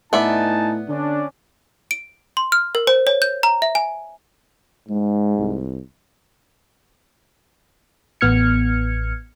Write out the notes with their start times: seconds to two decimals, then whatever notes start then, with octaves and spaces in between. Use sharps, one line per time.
0.13 A2 B3 D#4 D5 E5 G#5 A5
0.89 D3 C#4 D4
1.91 D7
2.37 C6
2.52 F6
2.75 A#4
2.87 C5
3.07 C#5
3.22 G6
3.43 A#5
3.62 E5
3.75 G#5
4.89 G#2 G#3
5.38 C2
8.21 A1 B3 F6 G#6 C#7